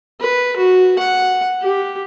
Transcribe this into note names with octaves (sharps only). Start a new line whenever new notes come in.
B4
F#4
F#5
G4